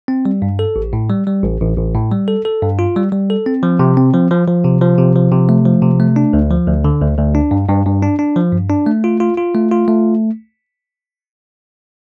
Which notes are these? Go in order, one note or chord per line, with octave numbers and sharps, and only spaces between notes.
C4
G3
G2
A4
A1
A2
G3
G3
A1
A1
A1
A2
G3
A4
A4
G2
F4
G3
G3
A4
C4
F3
C3
C4
F3
F3
F3
C3
F3
C3
F3
C3
A3
F3
C3
A3
D4
D2
F3
D2
D3
D2
D2
D4
G2
G2
G2
D4
D4
F3
G2
D4
A3
F4
F4
F4
A3
F4
A3